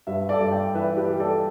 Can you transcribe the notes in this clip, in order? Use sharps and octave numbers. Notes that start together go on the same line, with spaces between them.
G2 B4 E5
A4 D5
G2
D5 G5
E3 B4 E5
G4 B4
G3
A4 D5